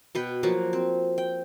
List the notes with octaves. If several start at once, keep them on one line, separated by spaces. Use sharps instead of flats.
B2 B4 G5
F3 F#3 A#3 F#4
C4
G5